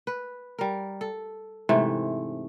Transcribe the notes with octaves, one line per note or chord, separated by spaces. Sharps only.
B4
G3 A#4
A4
G#2 C3 E3 A3